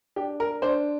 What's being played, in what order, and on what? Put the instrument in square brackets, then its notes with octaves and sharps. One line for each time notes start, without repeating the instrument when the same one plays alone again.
[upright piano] D4 G4
A#4
D4 C5